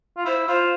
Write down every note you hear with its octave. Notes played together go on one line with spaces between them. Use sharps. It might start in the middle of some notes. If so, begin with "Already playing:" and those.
F4
E4 C5
F4 C5